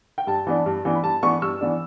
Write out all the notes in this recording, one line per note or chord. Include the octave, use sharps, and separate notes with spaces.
G5
G2 A5
E3 B3 D4
G2
E3 B3 D4
B5
G2 A5
E3 B3 D4 C#6
G2 E6
E3 B3 D4